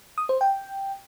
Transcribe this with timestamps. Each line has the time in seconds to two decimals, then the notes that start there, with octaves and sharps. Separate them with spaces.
0.18 D#6
0.29 C5
0.41 G5